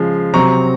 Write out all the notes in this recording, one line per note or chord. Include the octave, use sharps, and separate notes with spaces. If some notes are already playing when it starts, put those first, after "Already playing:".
Already playing: C#3 F3 G#3
C3 F#3 C4 A#5 C#6